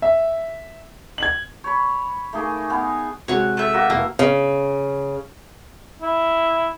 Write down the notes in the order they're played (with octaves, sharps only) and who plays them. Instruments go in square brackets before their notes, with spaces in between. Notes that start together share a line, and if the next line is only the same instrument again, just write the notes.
[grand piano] E5
G#6 F#7
[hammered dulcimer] C#5 B5
A3 A#3 D#4 G#4
B3 F5 G#5
[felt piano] C3 G#3 [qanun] F#4 C#5
[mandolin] A3 E5
[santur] A#3 F#4
[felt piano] F1 E4 A5 [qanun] A#3 [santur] E5
[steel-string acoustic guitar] C#3
[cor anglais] E4